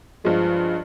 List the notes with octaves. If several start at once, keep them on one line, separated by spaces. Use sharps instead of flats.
G2 F3 G#3